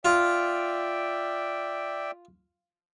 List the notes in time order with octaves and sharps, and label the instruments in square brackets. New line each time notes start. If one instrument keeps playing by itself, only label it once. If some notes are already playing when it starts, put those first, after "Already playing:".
[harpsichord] F4 [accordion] D5 E5 G5